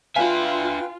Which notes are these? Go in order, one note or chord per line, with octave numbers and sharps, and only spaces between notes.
D4 F4 B4 E5 F5 G5 G#5